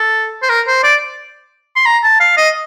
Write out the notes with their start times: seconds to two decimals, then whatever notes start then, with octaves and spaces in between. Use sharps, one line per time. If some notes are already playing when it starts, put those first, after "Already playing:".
Already playing: A4
0.42 C5
0.49 A#4
0.67 C5
0.83 D5
1.76 C6
1.86 A#5
2.03 A5
2.20 F5
2.37 D#5